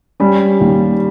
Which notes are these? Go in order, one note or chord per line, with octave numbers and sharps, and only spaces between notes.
G3 C#4
D#2